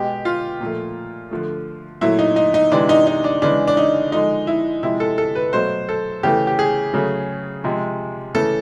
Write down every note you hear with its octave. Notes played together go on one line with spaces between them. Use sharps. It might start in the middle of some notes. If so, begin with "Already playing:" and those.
Already playing: B2 G#3 G4
F4
A#2 F3 A3
D3 F3 A3
A#2 F#3 A3 E4
D#4
D#4
D#4
C3 E3 G#3 D4
D#4
D#4
D4
C#3 E3 G#3 D4
D4
D#4
D3 F3 G#3 D#4
E4
C3 F3 G#3 E4
A4
A4
B4
B2 F#3 A3 C5
A4
C#3 E3 A3 G4
G4
G#4
C#3 F#3 A3
C3 F3 G#3
C#3 E3 A3 A4